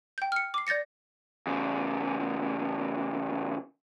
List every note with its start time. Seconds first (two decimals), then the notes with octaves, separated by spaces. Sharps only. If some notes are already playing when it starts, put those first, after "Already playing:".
0.18 G5 G6
0.32 F6 C#7
0.54 D6 C7
0.67 D5 G6 A6 A#6 C#7
1.47 E2 C#3